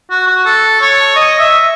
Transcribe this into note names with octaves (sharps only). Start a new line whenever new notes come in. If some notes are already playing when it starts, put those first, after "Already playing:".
F#4
F#4
A4
C#5
D#5
E5